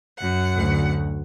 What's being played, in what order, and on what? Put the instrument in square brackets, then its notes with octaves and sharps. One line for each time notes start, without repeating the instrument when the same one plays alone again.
[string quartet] F#2 F#5
[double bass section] D2